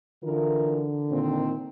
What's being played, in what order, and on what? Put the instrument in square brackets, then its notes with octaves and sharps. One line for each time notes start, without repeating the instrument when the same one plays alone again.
[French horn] D3 [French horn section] E3 F4 A#4
[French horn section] A#2 D#3 C4